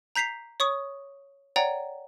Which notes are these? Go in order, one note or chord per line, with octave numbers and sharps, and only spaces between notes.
A#5 G6 B6 C7 F7
C#5 C#6 D#6
C#5 D5 F#5 G5 A#5